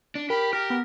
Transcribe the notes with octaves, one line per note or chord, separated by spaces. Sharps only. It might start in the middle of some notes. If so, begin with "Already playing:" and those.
D4
G4 A#4 B5
G4 A#4 F6
B3